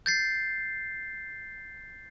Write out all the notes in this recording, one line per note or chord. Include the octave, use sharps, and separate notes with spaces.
G6 A6 C7